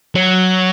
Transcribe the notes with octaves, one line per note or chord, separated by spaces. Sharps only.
F#3